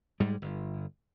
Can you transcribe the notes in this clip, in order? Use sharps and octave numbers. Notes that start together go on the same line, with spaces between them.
G#2 G3 G#3
G1